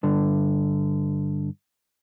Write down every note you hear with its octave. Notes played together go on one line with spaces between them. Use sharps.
G2 D3